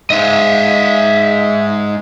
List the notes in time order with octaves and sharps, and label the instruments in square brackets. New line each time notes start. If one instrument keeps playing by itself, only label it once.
[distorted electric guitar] G#2 G#3 [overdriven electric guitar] D#5 E5